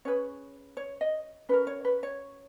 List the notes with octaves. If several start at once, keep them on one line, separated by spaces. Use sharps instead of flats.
C#4 G#4 B4 C#5
C#5
D#5
C#4 F#4 A#4 B4
C#5
B4
C#5